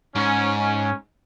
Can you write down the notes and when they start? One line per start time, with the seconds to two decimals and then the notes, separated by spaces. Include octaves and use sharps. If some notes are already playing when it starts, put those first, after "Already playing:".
0.15 G#2 C#4
0.57 C#4